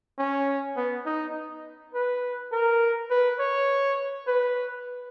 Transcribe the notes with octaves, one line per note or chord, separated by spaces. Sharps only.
C#4
B3
D#4
B4
A#4
B4
C#5
B4